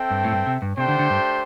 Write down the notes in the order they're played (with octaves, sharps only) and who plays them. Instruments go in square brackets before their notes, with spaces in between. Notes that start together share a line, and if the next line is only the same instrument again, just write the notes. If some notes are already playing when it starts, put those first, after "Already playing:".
Already playing: [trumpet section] C4 A4 E5 G5
[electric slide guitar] G2
A2
G2
C3
G2
[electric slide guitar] C3 [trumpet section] A3 D4 G4 C5 G5
[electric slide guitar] D3
D3
G2